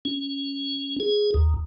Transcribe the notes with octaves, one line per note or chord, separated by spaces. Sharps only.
C#4
G#4
D#2